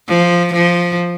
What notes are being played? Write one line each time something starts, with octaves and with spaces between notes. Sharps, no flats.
F3
F3